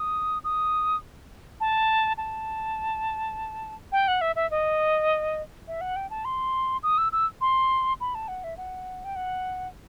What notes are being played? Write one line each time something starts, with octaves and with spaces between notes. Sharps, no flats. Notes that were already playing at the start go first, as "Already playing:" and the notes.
Already playing: D#6
D#6
A5
A5
G5
F#5
E5
E5
D#5
E5
F#5
G5
A5
C6
D#6
E6
E6
C6
B5
A5
F#5
E5
F#5
G5
F#5